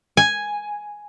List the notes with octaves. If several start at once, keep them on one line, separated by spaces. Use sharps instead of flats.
G#5